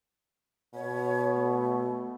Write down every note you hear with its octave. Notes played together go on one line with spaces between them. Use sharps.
B2 C#5
A3